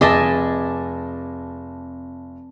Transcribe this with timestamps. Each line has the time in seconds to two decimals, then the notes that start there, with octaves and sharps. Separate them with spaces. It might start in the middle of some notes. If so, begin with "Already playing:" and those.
0.01 F1 C4 G#4 D#5 E5 A5 D6 A6